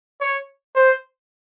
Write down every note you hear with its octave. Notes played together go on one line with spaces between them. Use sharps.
C#5
C5